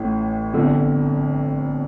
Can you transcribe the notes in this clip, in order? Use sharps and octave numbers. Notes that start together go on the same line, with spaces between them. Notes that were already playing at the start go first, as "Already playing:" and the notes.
Already playing: A1 A2 E3
G1 F2 D3